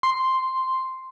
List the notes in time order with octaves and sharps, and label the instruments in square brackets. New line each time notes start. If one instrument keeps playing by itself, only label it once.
[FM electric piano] C6